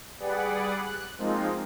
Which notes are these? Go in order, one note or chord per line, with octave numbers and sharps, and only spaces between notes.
G3 G#4 B4 D5 F#5
F#6
F3 G#3 A#3 C4 D#4 F4